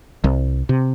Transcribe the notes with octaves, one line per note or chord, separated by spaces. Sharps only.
C2
C3